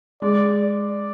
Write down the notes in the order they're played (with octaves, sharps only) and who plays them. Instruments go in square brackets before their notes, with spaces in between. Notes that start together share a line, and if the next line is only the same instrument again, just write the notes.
[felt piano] G#3 [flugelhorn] D5
[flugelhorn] D5